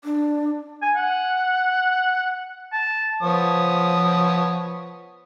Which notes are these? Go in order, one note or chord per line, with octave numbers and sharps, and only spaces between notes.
D4
G#5
F#5
A5
F3 B3 C#5 D#6